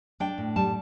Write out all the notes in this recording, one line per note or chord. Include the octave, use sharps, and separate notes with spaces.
D4 G5
A2
G3 A5